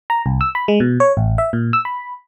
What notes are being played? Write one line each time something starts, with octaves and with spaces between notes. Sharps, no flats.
A#5
C2
E6
B5
G#3
B2
C#5
A1
E5
A#2
E6
B5